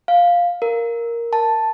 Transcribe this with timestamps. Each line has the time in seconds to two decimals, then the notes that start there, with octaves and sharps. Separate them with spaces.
0.08 F5
0.62 A#4
1.33 A5